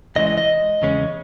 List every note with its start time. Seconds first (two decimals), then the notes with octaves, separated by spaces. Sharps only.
0.16 C#2 C#3 E3 G#3 D#5
0.27 D#5
0.38 D#5
0.82 E2 C#3 G#3 C#4